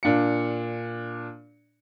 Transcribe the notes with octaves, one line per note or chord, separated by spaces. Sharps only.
A#2 D4 F5 C#7